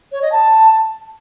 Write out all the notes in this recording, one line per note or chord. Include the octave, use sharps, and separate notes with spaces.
C#5
D#5
A5